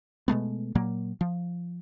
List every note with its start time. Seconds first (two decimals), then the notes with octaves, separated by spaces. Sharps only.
0.28 B2 G#3 A3 B3
0.75 A#2 F#3 A#3
1.21 F3